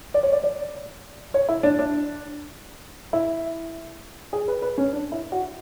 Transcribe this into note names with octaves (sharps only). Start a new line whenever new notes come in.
D5
C#5
D5
D5
C#5
E4
D4
D4
E4
G#4
B4
B4
C#4
D4
E4
F#4